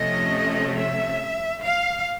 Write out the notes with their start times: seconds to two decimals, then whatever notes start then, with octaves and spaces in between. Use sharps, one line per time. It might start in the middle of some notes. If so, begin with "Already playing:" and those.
Already playing: C3 F3 A3 C#4 D#5
0.77 E5
1.63 F5